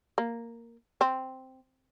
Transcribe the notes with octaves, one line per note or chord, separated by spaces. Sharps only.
A#3
C4